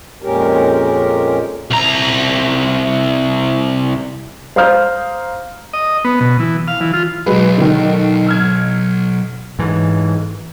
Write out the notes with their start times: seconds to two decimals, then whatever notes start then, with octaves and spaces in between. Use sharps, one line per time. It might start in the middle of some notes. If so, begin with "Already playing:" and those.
0.23 F2 A#2 G#3 C#4 G4 A#4
1.71 C2 A#5
4.56 C5 F5 A#5 D#6 F6 G6
5.73 D#5
6.05 B3
6.21 B2
6.39 E3
6.68 F5
6.81 E3
6.94 F4
7.26 B1 F#2 F#3 G#3 B4
7.58 D3 D#3
8.27 E6 F6 G#6
9.59 G#2 E3